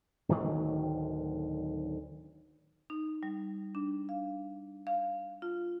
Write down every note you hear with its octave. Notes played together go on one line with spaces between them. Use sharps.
D1 D2 D#3 F#3
D#4
G3
D4
F5
F5
F4